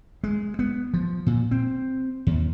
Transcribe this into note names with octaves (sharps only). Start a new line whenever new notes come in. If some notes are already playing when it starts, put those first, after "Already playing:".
G#3
B3
F3
A#2
C4
D#2